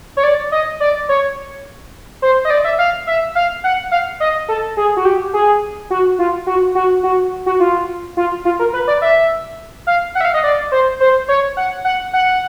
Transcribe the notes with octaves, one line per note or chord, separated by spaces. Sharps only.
C#5
D5
D#5
D5
C#5
C5
D#5
D5
E5
F5
E5
F5
F#5
F5
D#5
A4
G#4
F#4
G4
G#4
F#4
F4
F#4
F#4
F#4
F#4
F4
F4
F4
A#4
B4
D5
E5
F5
F#5
E5
F5
D#5
D5
C5
C5
C#5
F#5
F#5
F#5